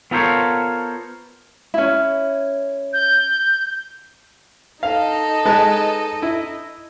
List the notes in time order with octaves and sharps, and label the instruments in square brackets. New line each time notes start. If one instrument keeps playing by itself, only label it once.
[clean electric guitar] B3 F4 A4 A#4 C5 C#5
[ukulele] C#4 E4
[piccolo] G6
[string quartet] D#4 A4 D#5 [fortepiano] F5
[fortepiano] G#3 B4 A5
E4